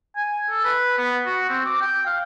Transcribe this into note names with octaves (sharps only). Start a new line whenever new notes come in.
G#5
A4
B4
B3
F#4
C4
D6
G5
F5